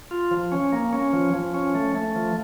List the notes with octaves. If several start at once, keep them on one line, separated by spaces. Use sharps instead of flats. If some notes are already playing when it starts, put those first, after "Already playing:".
F4
F3
C#4
A#3
C#4
F3
F3
C#4
A3
A3
F3